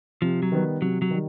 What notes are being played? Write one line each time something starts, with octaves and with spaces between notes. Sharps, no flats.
C3 F3
F#3
D#3 G3 B3
C3 F#3
F#3
D#3 G3